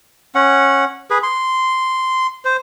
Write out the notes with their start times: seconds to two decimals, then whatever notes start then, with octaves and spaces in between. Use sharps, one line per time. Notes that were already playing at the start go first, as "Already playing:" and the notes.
0.35 C#4 F#5
1.10 G#4 B4
1.23 C6
2.45 C5